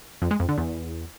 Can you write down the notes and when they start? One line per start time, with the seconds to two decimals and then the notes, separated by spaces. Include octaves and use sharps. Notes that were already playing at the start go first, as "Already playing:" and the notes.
0.22 F2
0.31 G#3
0.40 F2
0.49 D3
0.58 E2